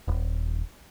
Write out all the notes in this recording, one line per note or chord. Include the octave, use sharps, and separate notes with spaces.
D#1